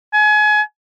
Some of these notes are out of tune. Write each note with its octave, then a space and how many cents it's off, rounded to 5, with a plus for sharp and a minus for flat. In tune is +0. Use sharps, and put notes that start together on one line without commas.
G#5 +30